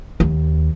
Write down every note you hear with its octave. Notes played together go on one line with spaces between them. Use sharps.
D#2